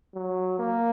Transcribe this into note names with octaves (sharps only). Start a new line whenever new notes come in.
F#3
A#3